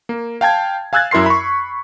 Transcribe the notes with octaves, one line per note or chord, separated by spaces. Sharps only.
A#3
F5 G5 A5 G#6
F5 G#5 E6 F#6 G#6 A6
F#2 E4 A#4 C6 C7
B5 C#6